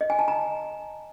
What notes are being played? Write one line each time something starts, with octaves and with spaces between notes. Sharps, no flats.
D#5
G#5
A5
A#5